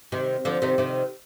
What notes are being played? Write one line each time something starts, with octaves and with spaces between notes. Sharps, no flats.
C3 D#3
D3 F3
C3 D#3
C3 D#3